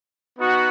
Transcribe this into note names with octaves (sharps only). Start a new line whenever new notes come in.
B3 D#4 F#4